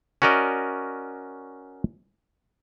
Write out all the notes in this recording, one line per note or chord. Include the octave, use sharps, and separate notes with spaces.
C#4 F#4 A#4 D5 D#5